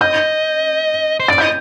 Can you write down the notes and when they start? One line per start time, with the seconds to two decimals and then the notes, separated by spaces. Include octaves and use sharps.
0.01 D#5 G6
1.20 C5
1.28 D5 A6
1.38 D#5 G6